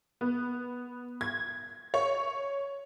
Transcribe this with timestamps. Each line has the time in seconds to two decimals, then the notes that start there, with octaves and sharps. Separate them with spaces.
0.21 B3
1.21 G#6
1.94 C#5